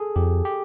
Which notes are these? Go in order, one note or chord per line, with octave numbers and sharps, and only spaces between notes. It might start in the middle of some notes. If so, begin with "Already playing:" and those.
Already playing: G#4 A4
F2 G4
G4